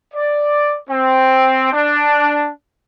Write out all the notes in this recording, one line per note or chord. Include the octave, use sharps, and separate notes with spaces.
D5
C4
D4